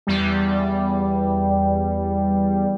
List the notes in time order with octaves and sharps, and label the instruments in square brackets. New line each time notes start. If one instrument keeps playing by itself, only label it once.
[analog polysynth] E2 G3